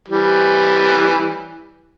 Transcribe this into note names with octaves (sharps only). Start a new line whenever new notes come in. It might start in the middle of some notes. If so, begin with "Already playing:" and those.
E3 G3